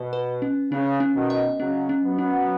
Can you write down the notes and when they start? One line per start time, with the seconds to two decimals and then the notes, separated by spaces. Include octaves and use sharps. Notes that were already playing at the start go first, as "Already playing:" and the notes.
Already playing: B2 B4
0.13 B4
0.42 C#4
0.71 C#3 C#4
1.00 C#4
1.15 B2 D#3
1.30 D#5
1.59 C#3 F#3 C#4
1.89 C#4
2.04 F#3 B3
2.18 C#4